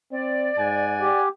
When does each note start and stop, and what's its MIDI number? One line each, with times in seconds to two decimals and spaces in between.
0.12 0.51 60
0.12 1.21 74
0.58 1.10 44
0.58 1.27 78
0.58 1.27 80
1.00 1.29 67